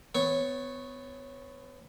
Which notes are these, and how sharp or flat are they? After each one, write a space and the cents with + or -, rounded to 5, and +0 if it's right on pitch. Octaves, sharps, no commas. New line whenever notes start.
B3 +30 C#5 -5